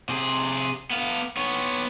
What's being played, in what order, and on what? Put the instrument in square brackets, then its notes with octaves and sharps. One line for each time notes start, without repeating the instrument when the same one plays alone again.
[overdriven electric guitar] C3 G#4
B3 F5
B3 C#5